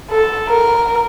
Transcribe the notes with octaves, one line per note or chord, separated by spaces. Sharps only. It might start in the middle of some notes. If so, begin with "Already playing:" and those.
A4
A#4